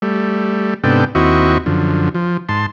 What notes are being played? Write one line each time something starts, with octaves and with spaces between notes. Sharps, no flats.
G3 A3
G#2 C3 B3 D4 A4 G5
D#2 C4 E4 F#4 D#5 C#6
F#2 D3 F3
F3
G#2 A5 C6